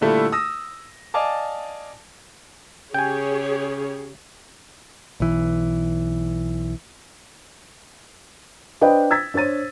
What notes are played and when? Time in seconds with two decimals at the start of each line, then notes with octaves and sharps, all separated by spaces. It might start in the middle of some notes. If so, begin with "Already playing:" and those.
0.01 A#2 D3 G3 A3 E4 F4
0.32 D#6 E6 A#6
1.14 D5 D#5 F5 G#5 A5 D6
2.94 C#3 G4 G#4 C#5 G5 G#5
5.20 B1 E3
8.81 D4 B4 C5 D#5 G5
9.11 E6 G#6 A6 B6
9.34 D4 C5 C#5 A6 D#7